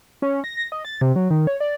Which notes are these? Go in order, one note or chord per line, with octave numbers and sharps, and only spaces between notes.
C#4
A#6
A#6
D#5
A6
C3
F#3
D#3
C#5
D5